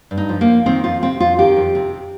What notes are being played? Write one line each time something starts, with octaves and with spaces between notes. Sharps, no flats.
G2
D#4
F3
A#3
F3
D#3 C4
F2 F4
C3 C4
F2 F4
D#3 G4
F2
C3